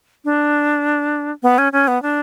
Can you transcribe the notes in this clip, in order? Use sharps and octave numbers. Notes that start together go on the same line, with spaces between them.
D4
B3
C#4
C#4
B3
D4